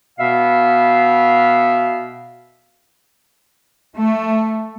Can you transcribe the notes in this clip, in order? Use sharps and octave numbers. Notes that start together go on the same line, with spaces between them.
B2 B3 E5 F5
A3